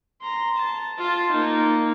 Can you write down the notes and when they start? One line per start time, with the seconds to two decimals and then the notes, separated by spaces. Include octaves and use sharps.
0.21 A#5 C6
0.56 A5
0.98 F4 A5
1.31 A#3 D#4